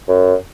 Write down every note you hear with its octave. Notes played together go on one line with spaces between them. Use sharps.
F#2